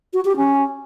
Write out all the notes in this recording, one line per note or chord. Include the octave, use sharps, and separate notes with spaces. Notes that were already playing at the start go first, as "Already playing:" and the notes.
F#4
G4
C#4